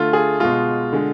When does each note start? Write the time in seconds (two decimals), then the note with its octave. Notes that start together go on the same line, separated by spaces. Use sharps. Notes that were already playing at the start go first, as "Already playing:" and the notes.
Already playing: D3 A3 F4
0.13 G#4
0.40 B2 G#3 F4
0.93 D3 G#3